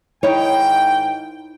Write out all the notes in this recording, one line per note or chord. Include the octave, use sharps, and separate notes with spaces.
G#2 D#3 D#4 E4 C#5 G5